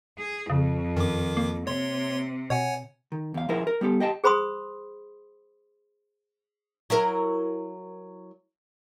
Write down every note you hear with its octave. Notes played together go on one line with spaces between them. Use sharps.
G#4
F2 C#3
F#2 D#3 D6
A#3
C3 C#5 C6
B2 C#5 F#5 G#5
D#3
E2 F5
F3 E4 G#4 A#4 C5
A#4
G3 B3 G4 A4
G4 D#5 G5 A5
G#4 C5 B5 C6 D#6
F#3 E4 A#4